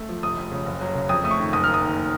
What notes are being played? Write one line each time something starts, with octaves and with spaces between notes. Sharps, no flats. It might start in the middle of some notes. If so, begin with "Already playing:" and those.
Already playing: A3
F3
F1 D#6
F1
C#3
F#1
F#3
C#3
F2 D#6
A3 D#6
C#6
D#3
F#1 D#6
A#3 F6
D#6
D#3